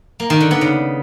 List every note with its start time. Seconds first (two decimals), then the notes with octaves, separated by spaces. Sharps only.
0.20 A#3
0.30 D#3
0.40 D3
0.51 B3
0.61 C#3